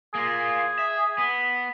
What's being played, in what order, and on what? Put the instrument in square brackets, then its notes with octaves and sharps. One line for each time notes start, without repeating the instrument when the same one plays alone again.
[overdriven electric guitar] A#3 F4 [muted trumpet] G#4
[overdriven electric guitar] E5
B3